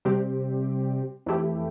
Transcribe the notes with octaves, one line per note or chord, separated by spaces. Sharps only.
C3 G3 C4 G4
F2 E3 A3 E4 G4